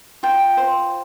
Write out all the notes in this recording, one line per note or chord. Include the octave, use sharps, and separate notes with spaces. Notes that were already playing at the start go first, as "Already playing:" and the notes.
F4 G5
C5